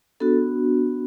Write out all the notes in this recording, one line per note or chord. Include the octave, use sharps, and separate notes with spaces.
B3 D4 F#4 A4